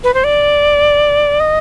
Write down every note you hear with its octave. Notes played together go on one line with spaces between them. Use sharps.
B4
C5
D5
D#5